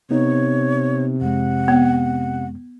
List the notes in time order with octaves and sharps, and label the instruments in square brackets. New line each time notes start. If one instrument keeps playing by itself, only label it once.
[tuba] C3 [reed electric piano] B3 D#4 [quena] C#5
[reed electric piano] F2 G#3 [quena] F#5
[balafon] B3